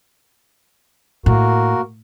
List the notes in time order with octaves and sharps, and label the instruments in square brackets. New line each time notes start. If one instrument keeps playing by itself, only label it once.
[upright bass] A2 [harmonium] A#3 F#4 A#4